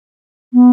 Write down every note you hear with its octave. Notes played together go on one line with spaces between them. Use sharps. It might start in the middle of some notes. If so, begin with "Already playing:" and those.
B3